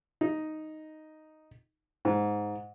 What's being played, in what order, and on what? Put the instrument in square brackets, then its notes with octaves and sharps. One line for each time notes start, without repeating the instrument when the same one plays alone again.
[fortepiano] D#4
G#2